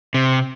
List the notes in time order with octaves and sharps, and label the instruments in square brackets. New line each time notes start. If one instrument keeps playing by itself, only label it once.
[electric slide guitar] C3